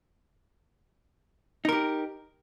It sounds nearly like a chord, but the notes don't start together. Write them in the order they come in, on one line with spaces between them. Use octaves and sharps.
D#4 A#4 G4